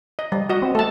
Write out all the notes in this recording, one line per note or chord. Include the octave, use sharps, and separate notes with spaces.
D#5
G3
F#4 D#5
C4
A3 A4 A5